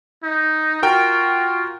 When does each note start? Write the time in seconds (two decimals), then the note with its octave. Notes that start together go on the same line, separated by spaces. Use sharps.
0.24 D#4
0.83 F4 F#4 A#4 G5